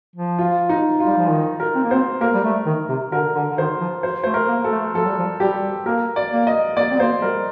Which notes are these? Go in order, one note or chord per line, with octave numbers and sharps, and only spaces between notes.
F3
F4
D#4
F4
G3
F3
D#3
A#4
C4
A#3
C4 C5
A#3 A#4
G3
A3
D#3
C3
D3 A#4
D3
D3
D#3 C5
F3
C5
A3 C5
A#4
A#3
A4
A3
F3 A4
G3
F3
G3 G4
A#3 A#4
D5
A#3
D#5
A#3 D5
C4
A#3 C5
G3 A#4